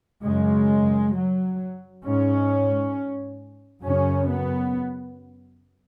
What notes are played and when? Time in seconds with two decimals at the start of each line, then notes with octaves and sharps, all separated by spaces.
0.24 F#2 C#3 G#3
1.15 F#3
2.04 G#2 C#4
3.83 F#2 C#3 C#4
4.29 B3